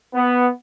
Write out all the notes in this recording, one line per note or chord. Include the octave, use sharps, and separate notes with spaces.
B3